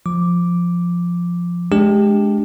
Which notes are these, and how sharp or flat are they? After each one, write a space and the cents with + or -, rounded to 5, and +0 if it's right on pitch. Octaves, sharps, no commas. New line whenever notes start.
F3 +0 D6 +0
G#3 +20 D4 +0 G4 +15